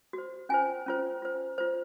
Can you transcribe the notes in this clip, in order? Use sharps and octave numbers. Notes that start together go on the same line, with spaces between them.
F#4 C5
C#4 F4 C5 G#5
C#4 F4 C5
F4 C5
F4 C5